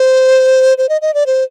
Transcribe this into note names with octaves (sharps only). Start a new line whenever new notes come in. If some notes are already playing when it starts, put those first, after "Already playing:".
Already playing: C5
C5
D#5
D#5
D5
C5